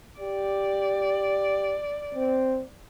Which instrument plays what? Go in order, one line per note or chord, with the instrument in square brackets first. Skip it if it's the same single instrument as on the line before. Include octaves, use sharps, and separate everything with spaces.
[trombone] G4 [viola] D5
[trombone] C4